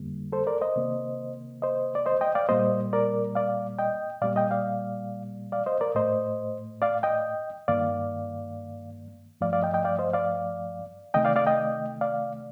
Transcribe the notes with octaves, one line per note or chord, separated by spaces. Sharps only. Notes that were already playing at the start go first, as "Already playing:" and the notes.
Already playing: F2 D3 G3 A#3
A4 C5
A#4 D5
C5 D#5
C3 D#3 A#3
C5 D#5
D5
C5 D#5
D#5 G5
D5 F5
A#2 G3 A#3 C5 D#5
A#4 D5
D5 F5
D#5 G5
A#2 G3 A#3 D5 F5
D#5 G5
D5 F5
D5 F5
C5 D#5
A#4 D5
A2 A3 C5 D#5
D5 F5
D#5 G5
G2 D#3 A#3 D5 F5
G2 F3 A3 D5 F5
D5 F5
D#5 G5
D#5 G5
D5 F5
C5 D#5
D5 F5
C3 D#3 A3 D#5 G5
D5 F5
D5 F5
D#5 G5
D5 F5